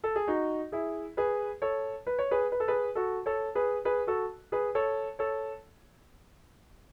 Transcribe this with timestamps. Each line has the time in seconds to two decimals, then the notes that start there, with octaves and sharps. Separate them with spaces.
0.04 A4
0.16 G#4
0.27 D#4 F#4
0.72 E4 G#4
1.17 G#4 B4
1.62 A4 C#5
2.07 B4
2.19 C#5
2.31 G#4 B4
2.52 B4
2.60 A4
2.68 G#4 B4
2.95 F#4 A4
3.26 A4 C#5
3.55 G#4 B4
3.85 G#4 B4
4.07 F#4 A4
4.52 G#4 B4
4.75 A4 C#5
5.19 A4 C#5